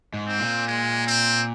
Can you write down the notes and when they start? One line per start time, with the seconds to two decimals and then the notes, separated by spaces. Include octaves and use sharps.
0.14 G#2
0.26 C4
0.40 A#2
0.67 G#3
1.07 C4